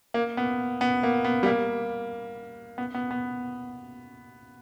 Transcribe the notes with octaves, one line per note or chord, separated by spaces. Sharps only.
A#3
B3
B3
A#3
B3
G3
A#3
B3
B3
B3